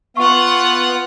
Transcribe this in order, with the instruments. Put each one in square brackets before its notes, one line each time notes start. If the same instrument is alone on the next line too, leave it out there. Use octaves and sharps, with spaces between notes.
[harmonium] B3 [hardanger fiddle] F4 F#5 [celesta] C#6